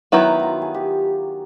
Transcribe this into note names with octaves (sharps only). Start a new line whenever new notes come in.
D#3 F#3 B3 E4
F4 F#4
G#4
G4